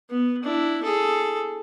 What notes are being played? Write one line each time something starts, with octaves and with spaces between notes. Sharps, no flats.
B3
D4 E4
G#4 A4